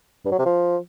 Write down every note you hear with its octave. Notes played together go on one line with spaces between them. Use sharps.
G2
F#3
C3
F3